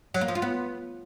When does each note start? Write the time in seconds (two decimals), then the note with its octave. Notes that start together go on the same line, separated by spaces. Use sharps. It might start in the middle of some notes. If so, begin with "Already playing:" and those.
0.14 F#3
0.21 A#3
0.28 F3
0.35 F4
0.42 B3